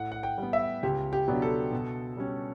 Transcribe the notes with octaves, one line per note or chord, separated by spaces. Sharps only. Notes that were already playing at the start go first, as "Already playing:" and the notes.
Already playing: A2 F#5
F#5
G5
G3 B3
E5
C#2 G4
G4
B2 F#3 B3 D4
A4
B2
G3 C#4